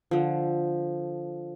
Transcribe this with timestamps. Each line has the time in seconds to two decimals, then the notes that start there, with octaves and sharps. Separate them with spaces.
0.11 D3 F3